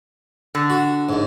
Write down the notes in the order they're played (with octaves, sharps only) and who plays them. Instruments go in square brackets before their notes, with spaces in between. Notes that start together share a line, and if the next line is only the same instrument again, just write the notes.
[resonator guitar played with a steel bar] D3
[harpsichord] F#4
D#2 G#2